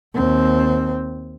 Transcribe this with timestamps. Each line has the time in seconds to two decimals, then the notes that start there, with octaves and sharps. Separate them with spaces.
0.14 D#2 C4